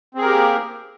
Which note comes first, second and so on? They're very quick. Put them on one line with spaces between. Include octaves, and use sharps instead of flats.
C4 G#4 A#4 G4 A#3